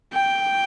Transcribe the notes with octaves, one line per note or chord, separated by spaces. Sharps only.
G5